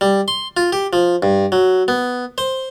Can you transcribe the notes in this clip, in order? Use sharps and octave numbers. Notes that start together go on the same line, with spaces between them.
G3
C6
F4
G4
F3
G2
F#3
B3
C5